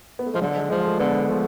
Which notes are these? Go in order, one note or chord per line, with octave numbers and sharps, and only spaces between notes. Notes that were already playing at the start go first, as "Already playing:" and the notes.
B3
A3
F3 G#3
D3 F#3
G#3
F3 G#3
A3
D3 B3
F3 A3